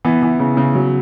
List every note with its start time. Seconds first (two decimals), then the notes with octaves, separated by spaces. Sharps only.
0.05 E3 B3
0.23 E3
0.40 C#3
0.57 C#3
0.75 F#3